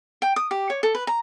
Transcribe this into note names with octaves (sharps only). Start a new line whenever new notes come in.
G5
D#6
G4
C#5
A4
B4
A#5